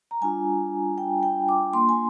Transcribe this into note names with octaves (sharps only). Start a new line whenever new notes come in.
A#5
G3 D4 F4 G#5
G5
G5
D6
A#3 D4 F4 C6
G#5